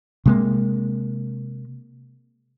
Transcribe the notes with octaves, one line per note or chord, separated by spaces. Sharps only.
C3 G#3 A#3